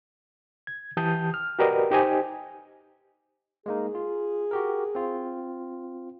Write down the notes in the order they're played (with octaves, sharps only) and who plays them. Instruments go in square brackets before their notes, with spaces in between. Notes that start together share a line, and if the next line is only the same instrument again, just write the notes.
[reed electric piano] G#6
E3 G4 A5 D#6 G6
F6
F#4 G4 A#4 B4 D5 D#5
D#4 G4 C5 D#5 G#5
[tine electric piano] G#3 A#3 D#4 [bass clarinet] G#4
[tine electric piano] F4
F#4 G4 A#4
C4 F4